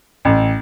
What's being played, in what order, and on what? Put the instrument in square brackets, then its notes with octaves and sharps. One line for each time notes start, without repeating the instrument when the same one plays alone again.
[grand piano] A1